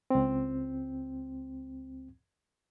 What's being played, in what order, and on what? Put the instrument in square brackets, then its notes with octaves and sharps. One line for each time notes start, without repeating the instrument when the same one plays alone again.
[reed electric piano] C#2 C4